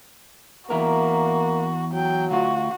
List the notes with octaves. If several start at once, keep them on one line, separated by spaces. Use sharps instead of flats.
E2 A#3 E4 F#4 A#4
F#3 G5
D2 F4 F#4